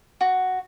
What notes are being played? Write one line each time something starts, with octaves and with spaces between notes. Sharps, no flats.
F#4